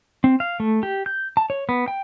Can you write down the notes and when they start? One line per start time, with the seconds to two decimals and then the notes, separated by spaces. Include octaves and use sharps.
0.24 C4
0.40 F5
0.60 A3
0.83 G4
1.06 G6
1.37 A5
1.50 C#5
1.69 B3
1.88 G5